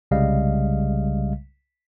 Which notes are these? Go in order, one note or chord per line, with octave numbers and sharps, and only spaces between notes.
C2 C#3 G3 G#3 D#5 F5